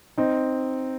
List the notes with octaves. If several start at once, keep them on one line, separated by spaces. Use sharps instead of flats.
C4 D#4